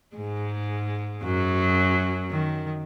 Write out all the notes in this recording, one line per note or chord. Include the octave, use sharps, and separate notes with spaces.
G#2 G#3
F#2 F#3
D#3